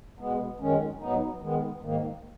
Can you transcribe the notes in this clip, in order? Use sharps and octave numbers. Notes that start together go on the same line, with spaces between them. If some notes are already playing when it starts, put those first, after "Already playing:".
B2 G#3 B3
F#2 D#3 G#3 C#4
G#2 F#3 B3 D#4
D#3 G#3 B3
G#2 D#3 A#3